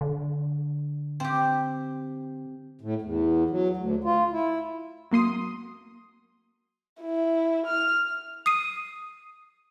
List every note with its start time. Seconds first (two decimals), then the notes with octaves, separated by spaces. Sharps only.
0.01 D3
1.20 C4 G4
2.81 A2
3.02 E2
3.50 F#3
3.77 D2
4.04 F4
4.32 E4
5.11 F#3 A#3 C6 D#6
7.01 E4
7.66 F6
8.46 D#6 C7 D#7